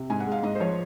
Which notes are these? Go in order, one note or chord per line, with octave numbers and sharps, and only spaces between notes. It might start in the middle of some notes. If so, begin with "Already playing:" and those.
Already playing: C3
G#2 G#5
F#5
G#3 F5
G#2 D#5
C5
F3 C#5